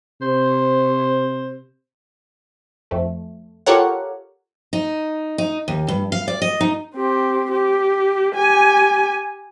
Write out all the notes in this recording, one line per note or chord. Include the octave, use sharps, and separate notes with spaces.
C3 C5
F2 A3
F4 G4 A4 A#4 C#5 F#5
D#4
D#4
D#2
G2
F5
D5
D#5
D#4
C4 G4
G4
G4 G#5